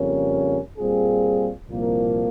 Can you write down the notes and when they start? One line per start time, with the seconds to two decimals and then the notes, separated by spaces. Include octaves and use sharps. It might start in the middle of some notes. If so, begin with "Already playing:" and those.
Already playing: F2 C#3 G3 A#3 C#4
0.78 A#2 G3 C4 F4 G#4
1.68 C2 A#2 F3 A#3